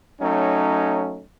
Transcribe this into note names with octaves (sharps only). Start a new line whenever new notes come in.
F#3 A3 C#4 D#4